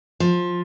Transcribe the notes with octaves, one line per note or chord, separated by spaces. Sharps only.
F3